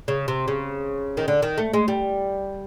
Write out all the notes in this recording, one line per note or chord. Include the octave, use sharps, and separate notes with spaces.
C#3
C3
C#3
D#3
D3
D#3
A3
G#3
G3